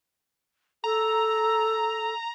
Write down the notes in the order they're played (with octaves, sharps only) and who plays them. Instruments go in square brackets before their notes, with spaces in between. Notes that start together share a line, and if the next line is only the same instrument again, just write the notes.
[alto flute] A4 [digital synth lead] A#5